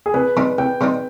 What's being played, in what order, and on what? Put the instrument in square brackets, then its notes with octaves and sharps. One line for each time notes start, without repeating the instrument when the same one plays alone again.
[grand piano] G#4
[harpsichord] C2 [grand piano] B4
[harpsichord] C3 G3 C4 D#4 [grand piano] B4
[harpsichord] C2 [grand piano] G5
[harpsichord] C3 G3 C4 D#4